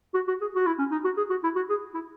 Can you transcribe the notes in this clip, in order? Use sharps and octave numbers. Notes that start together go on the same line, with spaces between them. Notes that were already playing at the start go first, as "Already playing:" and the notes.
F#4
F#4
G#4
F#4
E4
C#4
D#4
F#4
G#4
F#4
E4
F#4
G#4
E4